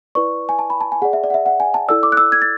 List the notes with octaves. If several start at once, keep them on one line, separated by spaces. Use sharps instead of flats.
E4 B4 D5 C#6
G#5
A5
B5
A5
G#5
G#4 D5 F#5
E5
D5
F#5
E5
F#5
G#5
A5
E4 A4 D5 E6
D6
F#6
E6
G#6
A6